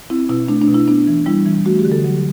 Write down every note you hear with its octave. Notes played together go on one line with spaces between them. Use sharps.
C4 E4
B2 E4
A3 D4
D4
B2
E4
B3 D4
E3
G3 E4
E3
A3 F#4
G4
D3
A4
F#3